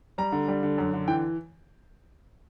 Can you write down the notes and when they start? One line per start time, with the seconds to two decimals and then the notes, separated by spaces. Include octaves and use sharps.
0.18 G3 A#5
0.32 D3
0.48 G3
0.63 D3
0.78 F#2
0.94 D3
1.08 E3 G5